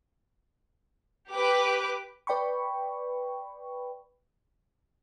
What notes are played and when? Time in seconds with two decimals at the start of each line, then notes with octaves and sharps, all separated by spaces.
1.31 G4 B4 D6
2.27 B4 D5 G5 B5 C#6